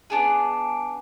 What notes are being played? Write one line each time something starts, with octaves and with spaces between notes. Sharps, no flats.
B3 D4 G#4